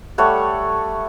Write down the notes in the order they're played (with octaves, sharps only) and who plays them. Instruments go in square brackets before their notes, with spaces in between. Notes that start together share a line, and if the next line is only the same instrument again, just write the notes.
[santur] G3 A3 C#5 F#5